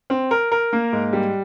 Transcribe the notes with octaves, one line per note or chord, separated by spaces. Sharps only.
C4
A#4
A#4
A#3
G#2
G3